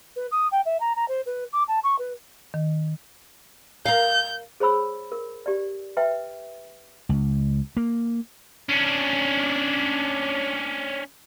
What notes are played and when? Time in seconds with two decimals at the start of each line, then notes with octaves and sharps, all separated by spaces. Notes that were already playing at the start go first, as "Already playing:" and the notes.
0.16 B4
0.32 D#6
0.52 G5
0.65 E5
0.80 A#5
0.96 A#5
1.08 C5
1.26 B4
1.53 D6
1.68 A5
1.84 C#6
1.99 B4
2.54 D#3
3.86 A#4 F5 G6
4.60 G#4 C5 C#5 B5 E6
5.12 A#4
5.46 G4 D5
5.97 B4 E5 G5
7.09 C#2
7.77 A#3
8.69 C#4 D4